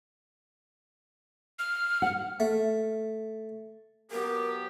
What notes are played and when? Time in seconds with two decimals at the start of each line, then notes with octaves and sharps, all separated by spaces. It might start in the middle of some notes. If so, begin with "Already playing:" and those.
1.59 F6
2.02 F#5
2.40 A3
4.11 F#3 B3 G4 A#4